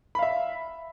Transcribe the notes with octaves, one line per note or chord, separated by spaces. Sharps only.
E5 F5 B5